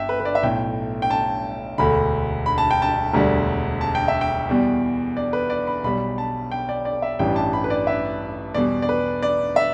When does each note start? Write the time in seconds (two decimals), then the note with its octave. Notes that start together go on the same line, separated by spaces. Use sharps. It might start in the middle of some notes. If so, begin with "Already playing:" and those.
Already playing: G1 G2 E5 G5
0.09 B4
0.20 B4
0.25 D5
0.35 E5
0.43 B1 A2 A3 G5
1.02 G5
1.10 A5
1.78 E1 D2 D3 B5
2.46 B5
2.58 A5
2.71 G5
2.82 A5
3.13 E1 D2 D3 G3
3.81 A5
3.95 G5
4.08 E5
4.21 G5
4.49 E2 B2 G3
5.17 D5
5.33 B4
5.50 D5
5.67 B5
5.84 B1 B2 G3 B5
6.18 A5
6.52 G5
6.69 D5
6.85 D5
7.02 E5
7.19 A1 G2 E3 G3 G5
7.36 A5
7.53 B5
7.64 B4
7.70 D5
7.87 E5
8.54 E2 B2 G3 D5
8.82 D5
8.89 B4
9.23 D5
9.56 E5